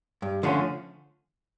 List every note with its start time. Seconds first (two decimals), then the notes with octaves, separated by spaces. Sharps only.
0.22 G2
0.43 D3 F3 A3 C#4